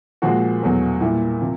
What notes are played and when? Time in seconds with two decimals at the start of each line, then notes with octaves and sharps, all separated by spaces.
0.22 A#2 F3 G#3 F#4
0.62 E2 B2 F#3 A3
1.00 A#2 G3 E4
1.41 C3 F3